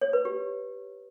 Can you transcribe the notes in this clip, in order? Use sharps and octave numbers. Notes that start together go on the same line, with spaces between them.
C#5
B4
G4